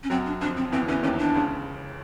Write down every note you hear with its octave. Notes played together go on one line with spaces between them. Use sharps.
C#4
F#2 F#3 C4
D4
F2 F3 D4
C4
E2 E3 C4
E2 E3 C#4
D#2 D#3 C#4
D4
C#2 C#3